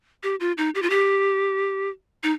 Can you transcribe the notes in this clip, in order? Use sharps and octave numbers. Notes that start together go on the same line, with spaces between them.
G4
F4
D#4
G4
F4
G4
D#4